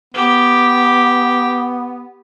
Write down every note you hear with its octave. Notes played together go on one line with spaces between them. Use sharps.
B3 G4